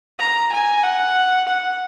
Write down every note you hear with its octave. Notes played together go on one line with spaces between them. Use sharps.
A#5
G#5
F#5
F#5